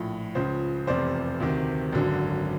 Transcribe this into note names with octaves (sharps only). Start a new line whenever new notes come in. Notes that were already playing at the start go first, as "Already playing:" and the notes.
Already playing: A#1 A2 F3
C#2 C#3 F3 C5
F1 E2 C3 C5 D5
D2 C3 D#3
G#1 F#2 D3 F#3